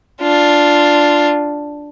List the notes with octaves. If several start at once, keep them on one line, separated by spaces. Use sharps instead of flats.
D4 F4